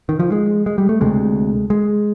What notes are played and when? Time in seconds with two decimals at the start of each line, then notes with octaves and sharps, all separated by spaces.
0.09 D#3
0.19 F3
0.32 G#3
0.66 G#3
0.78 G3
0.89 A3
1.01 D2 C3 G#3
1.70 G#3